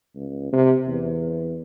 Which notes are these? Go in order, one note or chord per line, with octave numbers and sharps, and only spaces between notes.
C#2
C3
E2